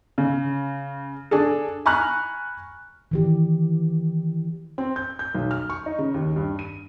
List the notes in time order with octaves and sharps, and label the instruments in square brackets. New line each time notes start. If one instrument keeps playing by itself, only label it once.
[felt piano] C#3
D4 G#4 A4
G#5 A#5 B5 C#6 F6 F#6
[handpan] D#3 E3 G4
[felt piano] C4
G6
G6
B1
F6
C#6
D#4
C#3
D#2
G2
D#7